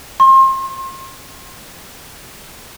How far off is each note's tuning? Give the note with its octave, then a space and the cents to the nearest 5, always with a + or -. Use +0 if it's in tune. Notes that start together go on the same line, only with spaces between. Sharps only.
C6 +35